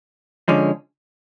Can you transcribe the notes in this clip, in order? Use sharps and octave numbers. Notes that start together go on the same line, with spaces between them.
D3 F3 G#3 C#4